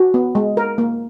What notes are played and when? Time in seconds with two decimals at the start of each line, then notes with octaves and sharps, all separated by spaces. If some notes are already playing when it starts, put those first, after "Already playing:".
Already playing: F#4
0.14 B3
0.35 G#3
0.57 A#4
0.78 A#3